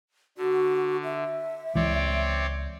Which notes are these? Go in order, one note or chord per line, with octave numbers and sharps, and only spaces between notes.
D3 F#4
E5
C#2 E3 G#3 C4 C#5 D5